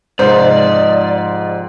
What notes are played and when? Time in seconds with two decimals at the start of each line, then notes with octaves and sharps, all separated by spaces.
0.19 G#2 C3 F3 C5 D5 D#5